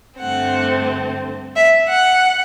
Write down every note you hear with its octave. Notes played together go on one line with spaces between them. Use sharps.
G2 D3 A3 C4 F#5
E5
F#5